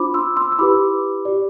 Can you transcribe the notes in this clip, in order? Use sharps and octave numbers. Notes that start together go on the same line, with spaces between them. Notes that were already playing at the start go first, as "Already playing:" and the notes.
Already playing: D4 F4 C5 B5 D6
C6 E6
C6 E6
E6
E4 G4 B4 B5 D6
G4 D5